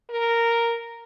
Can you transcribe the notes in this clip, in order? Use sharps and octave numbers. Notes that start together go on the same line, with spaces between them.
A#4